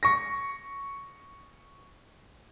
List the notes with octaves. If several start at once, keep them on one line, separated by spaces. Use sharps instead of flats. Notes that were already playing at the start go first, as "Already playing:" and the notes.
C#6 A#6